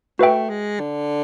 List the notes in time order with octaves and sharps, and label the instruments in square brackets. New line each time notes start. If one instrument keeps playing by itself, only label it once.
[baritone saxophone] A3 [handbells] F#4 B4 E5 G5
[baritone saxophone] G#3
D3